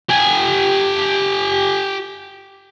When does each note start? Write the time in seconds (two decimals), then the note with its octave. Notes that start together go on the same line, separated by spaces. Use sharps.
0.09 G4 G#5